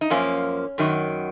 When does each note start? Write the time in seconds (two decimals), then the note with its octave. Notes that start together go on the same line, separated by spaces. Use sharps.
0.01 D#4
0.10 F#2 F3 A#3 C#4
0.78 F#2 D#3 F#3